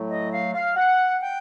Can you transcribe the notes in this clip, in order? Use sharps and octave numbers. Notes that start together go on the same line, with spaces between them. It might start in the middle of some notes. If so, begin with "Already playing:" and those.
Already playing: A2 F#3 A3
D#5
F5
F5
F#5
G5